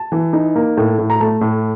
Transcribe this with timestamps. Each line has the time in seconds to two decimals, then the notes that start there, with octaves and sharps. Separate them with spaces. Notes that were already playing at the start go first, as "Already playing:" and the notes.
Already playing: A5
0.12 E3
0.33 D#4
0.56 A#3
0.77 A2
0.98 A2
1.10 A#5
1.21 A3 A5
1.41 A2